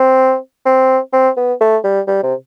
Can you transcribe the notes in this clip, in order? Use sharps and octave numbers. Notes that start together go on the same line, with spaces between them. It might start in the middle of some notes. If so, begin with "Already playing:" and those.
Already playing: C4
C4
C4
B3
A3
G3
G3
C3